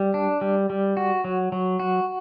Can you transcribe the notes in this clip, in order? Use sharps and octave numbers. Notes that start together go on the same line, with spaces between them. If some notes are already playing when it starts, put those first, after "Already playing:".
Already playing: G3
D4
G3
G3
F#4
F#3
F#3
F#4